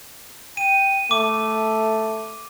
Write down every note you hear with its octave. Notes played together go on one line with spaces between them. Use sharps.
G5 D#7
A3 D6